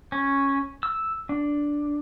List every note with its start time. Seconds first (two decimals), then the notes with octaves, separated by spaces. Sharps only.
0.12 C#4
0.83 E6
1.29 D4